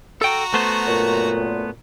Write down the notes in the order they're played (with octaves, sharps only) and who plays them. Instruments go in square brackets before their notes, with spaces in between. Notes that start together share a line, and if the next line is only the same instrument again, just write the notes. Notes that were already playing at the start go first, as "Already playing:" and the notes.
[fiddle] F#4 A#5 [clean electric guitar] A4 G5
[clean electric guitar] A3 B3 C5
[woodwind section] F#2 A#2